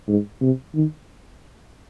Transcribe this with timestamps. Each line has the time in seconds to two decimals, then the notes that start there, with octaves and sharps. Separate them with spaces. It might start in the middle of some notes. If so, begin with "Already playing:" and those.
0.08 G#2
0.41 C3
0.75 D#3